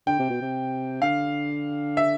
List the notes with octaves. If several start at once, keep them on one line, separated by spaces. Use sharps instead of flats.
D3 G5
C3
B2
C3
D3 F5
E5